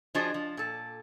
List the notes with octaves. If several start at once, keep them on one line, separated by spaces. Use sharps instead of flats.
F3 D4 F#4 G#4 C5 D#5
F3
A#2 A4